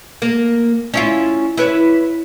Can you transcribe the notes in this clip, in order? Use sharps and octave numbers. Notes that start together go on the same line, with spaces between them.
A#3
C#4 E4 F4
E4 B4 C#5